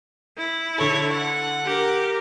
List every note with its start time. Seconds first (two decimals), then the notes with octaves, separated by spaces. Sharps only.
0.38 E4
0.78 D3 A4 C#5
1.12 F#5
1.65 G4 A#4